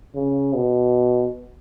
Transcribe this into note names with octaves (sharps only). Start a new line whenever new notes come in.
C#3
B2